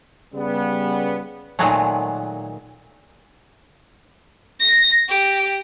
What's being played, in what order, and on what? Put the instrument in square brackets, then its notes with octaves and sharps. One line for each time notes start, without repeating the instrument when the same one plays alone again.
[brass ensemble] C#3 G3 B3
[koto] A#2 D#3 F#3 G#3 A3
[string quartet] A#6
G4